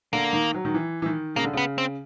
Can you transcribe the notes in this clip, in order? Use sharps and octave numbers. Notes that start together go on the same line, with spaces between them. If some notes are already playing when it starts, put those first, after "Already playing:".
D3 A#3
D#3
F#3
D#3
E3
E3
D#3
C#3 A#3
D3
C#3 B3
C4